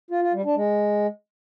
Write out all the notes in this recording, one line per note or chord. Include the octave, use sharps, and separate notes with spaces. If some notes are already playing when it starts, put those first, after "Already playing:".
F4
F4
G3
D4
G#3